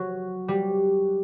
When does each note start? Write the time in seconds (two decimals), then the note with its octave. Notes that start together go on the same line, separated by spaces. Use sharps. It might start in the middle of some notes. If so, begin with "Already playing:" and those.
Already playing: F#3
0.48 G3